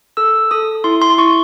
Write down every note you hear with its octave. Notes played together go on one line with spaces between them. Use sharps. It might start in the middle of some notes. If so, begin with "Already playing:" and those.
A4 E6
A4 D#6
E4 C6
C6
E4 C#6